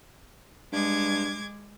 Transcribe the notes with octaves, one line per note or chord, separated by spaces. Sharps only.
G2 G#3 D6 G#6